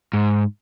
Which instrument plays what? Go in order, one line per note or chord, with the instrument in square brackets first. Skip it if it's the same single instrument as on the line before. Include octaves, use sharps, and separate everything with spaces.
[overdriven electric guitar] G#2